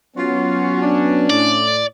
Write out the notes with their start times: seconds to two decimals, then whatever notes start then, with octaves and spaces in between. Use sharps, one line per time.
0.17 F#3 B3 C#4 F4 F#4
0.83 D4
1.30 A2 D5